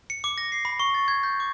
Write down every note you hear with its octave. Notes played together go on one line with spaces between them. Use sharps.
C#7
D6
A#6
C7
B5
C#6
A6
G#6
G6
D6